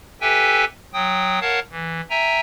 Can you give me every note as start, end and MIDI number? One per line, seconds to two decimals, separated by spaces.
0.21 0.65 67
0.21 0.65 69
0.21 0.65 71
0.21 0.65 76
0.21 0.65 79
0.21 0.65 80
0.94 1.39 54
0.94 1.39 79
0.94 1.39 87
1.41 1.60 70
1.41 1.60 73
1.41 1.60 77
1.41 1.60 78
1.41 1.60 81
1.71 2.01 52
2.10 2.41 76
2.10 2.41 79
2.10 2.41 80
2.10 2.41 82